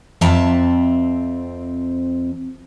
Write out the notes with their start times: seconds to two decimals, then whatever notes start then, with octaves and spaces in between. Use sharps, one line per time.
0.21 F2 C4 E5 A5 A#5